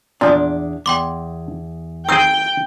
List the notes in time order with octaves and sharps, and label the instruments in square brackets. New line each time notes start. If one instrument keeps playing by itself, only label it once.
[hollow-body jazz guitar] E2 D4 [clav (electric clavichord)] A#2 F3
[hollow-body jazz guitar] E2 [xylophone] G5 C6 D6
[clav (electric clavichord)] D#3 C4 G#4 [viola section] G5 [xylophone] E6 G6